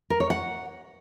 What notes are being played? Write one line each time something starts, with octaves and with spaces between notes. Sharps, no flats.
A#4
C#5
F#5